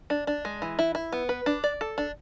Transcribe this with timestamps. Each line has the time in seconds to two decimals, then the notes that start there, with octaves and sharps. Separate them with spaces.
0.10 D4
0.27 D4
0.45 G#3
0.62 E3
0.79 E4
0.95 E4
1.12 B3
1.29 B4
1.46 D4
1.64 D5
1.81 A4
1.98 D4